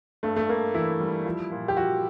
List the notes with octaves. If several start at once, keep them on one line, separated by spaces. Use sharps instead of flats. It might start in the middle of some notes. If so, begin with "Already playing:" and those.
G2 A3
A3
G2 A#3
E3 E4
G3
F3
A#2
G4
F3 F#4